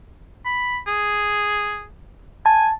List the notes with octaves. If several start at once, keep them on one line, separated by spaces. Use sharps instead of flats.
B5
G#4
G#5 A5